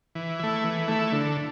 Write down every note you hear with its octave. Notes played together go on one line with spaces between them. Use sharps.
E3
A3 E4
E3
A3 E4
D3